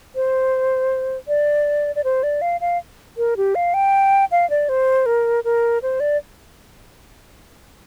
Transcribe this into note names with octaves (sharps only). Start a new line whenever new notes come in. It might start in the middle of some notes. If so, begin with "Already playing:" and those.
C5
D5
D5
C5
D5
F5
F5
A#4
G4
F5
G5
F5
D5
C5
A#4
A#4
C5
D5